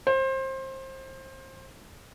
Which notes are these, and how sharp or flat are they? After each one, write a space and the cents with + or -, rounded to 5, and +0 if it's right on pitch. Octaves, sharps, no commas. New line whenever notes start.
C5 +25